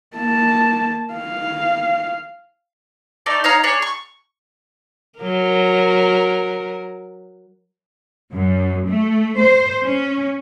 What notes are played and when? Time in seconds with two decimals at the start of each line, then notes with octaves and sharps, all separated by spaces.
0.17 A#3 A5
1.14 F5
3.26 A3 D#4 D5 A5
3.44 D#4 C#5 F5 A#5
3.63 D4 G#4 C#5
3.82 C#6
5.19 F#3 A#4
8.32 F#2
8.87 A3
9.39 C5
9.83 C#4